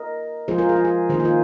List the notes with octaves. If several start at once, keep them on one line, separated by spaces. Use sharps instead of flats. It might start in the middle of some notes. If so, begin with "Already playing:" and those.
Already playing: A#4 D#5
F3 G#3 F4 G#4 C5
F4 A#4
G#4
F4
G#4
D#3 A#3 D#4 G#4 C5
G#4
F4 A#4